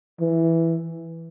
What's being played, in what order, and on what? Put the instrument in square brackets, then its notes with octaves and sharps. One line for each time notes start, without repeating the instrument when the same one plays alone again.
[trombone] E3